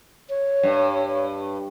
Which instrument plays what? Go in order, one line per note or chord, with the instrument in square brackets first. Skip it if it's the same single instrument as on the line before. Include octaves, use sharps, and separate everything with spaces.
[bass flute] C#5
[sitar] G2